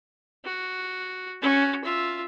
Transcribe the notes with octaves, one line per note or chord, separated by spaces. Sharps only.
F#4
C#4 F#4
F4 E5